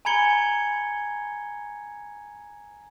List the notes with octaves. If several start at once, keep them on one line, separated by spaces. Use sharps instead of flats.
G#5 A#5 B5 G#6 C#7 G7